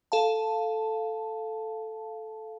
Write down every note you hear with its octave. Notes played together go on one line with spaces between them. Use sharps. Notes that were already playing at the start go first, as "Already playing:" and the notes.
A4 F5 A5